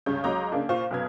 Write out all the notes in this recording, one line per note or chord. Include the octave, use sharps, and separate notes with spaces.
C#2 G2 C#3 C#5 G6
C#2 F#3 D#5 A#5 D6 G6
C#3 A#3 D4
A#2 F4 C5 F5 C#6
B1 F#2 B2 B3 G#6